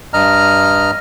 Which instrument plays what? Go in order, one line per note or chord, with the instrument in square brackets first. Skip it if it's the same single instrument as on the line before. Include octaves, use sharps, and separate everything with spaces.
[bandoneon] G2 D#5 A#5 F6